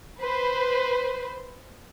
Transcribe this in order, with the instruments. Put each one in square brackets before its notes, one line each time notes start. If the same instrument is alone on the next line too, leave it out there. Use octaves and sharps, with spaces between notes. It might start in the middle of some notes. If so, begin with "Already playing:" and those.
[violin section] B4 C5